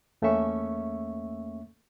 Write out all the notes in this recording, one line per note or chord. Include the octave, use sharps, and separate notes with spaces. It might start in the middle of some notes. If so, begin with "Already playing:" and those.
E2 A3 A#3 C#4 E5 C#6